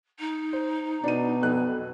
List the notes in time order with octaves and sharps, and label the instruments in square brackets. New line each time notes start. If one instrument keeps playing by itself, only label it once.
[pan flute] D#4
[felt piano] C5
[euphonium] B2 [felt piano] D4 D#7
[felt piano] B1 F2 F#6